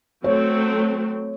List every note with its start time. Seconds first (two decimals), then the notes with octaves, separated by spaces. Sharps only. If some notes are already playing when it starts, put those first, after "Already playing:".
0.24 F#3 A3 C4 C#5